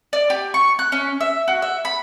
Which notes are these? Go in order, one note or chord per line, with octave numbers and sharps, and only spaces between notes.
D5
G4
C#6
F#6
C#4
E5
F#4
E5
B5